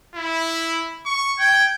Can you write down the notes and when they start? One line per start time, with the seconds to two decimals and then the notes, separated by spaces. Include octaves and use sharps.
0.15 E4
1.05 C#6
1.39 G5 G#6